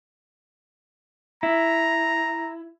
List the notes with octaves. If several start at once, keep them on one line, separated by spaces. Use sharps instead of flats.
E4 A#5